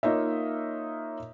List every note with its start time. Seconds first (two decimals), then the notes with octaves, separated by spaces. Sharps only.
0.03 A#3 D#4 F4 C#5 D#5 E5